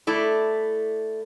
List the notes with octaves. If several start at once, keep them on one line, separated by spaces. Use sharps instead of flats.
A3 E4 D5